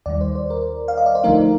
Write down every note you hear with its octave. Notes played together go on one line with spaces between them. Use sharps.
D#2 D#3 G3 D5
C5
C5
A#4
F5
D#5
D5
C5
D2 D3 F3 A3 D#4 A#4